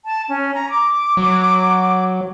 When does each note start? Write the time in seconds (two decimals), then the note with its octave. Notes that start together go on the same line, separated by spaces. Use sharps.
0.05 A5
0.29 C#4
0.54 A#5
0.70 D6
1.17 F#3